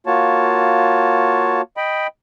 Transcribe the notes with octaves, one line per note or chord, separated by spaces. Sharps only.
A#3 F4 F#4 C#5 A5
D#5 G5 B5